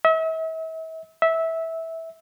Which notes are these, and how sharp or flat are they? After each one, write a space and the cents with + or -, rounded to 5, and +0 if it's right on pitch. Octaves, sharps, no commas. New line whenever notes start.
E5 -40
E5 -15